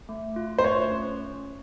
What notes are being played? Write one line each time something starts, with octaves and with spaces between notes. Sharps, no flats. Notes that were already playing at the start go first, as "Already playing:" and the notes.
A3
F4
C5
A3 C#5
C#4